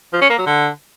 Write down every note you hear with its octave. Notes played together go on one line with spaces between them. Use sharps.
F3
C#4
A#3
F#3
D3